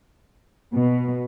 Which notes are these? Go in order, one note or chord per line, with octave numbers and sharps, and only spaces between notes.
B2